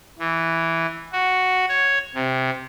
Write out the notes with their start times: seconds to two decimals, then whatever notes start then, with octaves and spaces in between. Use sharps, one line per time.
0.19 E3
1.12 F#4
1.69 C#5
2.15 C3